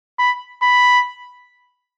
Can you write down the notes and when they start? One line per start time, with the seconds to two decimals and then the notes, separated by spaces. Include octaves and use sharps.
0.19 B5
0.62 B5